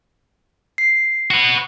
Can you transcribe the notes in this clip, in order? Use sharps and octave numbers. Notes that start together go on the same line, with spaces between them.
C7
F#4 B4